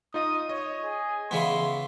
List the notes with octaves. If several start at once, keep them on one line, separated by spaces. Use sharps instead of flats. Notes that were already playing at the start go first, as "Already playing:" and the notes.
D#4 F4 D#5 D#6
C#5 D#5
G#4
C#3 E3 B3 C6